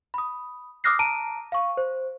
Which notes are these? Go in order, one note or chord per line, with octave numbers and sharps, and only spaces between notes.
B5 D#6
D6 D#6 F6 F#6 A#6 C7
A5 A#5 D7 D#7
F5 C#6
C5